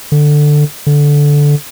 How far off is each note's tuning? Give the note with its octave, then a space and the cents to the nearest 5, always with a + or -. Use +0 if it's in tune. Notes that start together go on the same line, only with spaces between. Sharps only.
D3 +10
D3 -10